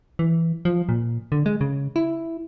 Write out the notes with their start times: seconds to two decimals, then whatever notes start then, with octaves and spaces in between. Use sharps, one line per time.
0.19 E3
0.65 F3
0.89 A#2
1.32 D3
1.46 G#3
1.61 C#3
1.96 E4